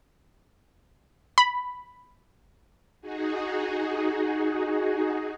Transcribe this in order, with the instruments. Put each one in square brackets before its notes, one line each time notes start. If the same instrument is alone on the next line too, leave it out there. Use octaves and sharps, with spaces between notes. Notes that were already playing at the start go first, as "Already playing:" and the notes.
[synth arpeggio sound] B5
[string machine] D#4 F#4 G#4